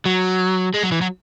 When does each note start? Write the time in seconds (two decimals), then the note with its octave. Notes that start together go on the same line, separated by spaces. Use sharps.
0.05 F#3
0.74 G#3
0.83 F#3
0.92 E3
1.01 F#3